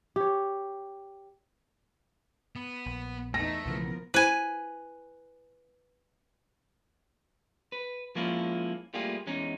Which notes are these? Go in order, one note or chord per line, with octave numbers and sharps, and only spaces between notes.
G4 C#5
B3
A#1
E2 A3 D#4 A#6
B1 C#3 E3 F3 B3 A#4
E4 B4 C5 G#5
B4
F3 G#3 A#3 C#4 E4 F4
G3 A3 A#3 F4 G4 G#4
E2 G#3 C#4 D#4